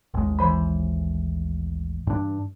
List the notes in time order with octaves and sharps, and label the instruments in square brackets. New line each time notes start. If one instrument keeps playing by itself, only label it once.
[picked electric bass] A1 D#2 G#3
[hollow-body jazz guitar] E3 C5 B5
[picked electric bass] G2 D4